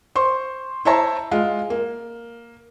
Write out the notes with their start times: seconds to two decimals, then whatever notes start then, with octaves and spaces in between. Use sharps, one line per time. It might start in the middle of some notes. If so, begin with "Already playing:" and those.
0.15 C5 C6 C#6
0.85 E4 C5 C#5 E5 A5 A#5
1.31 G#3 F4
1.70 A#3